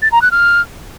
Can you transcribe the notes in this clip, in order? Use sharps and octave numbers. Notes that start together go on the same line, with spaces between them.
A6
A#5
F#6
F6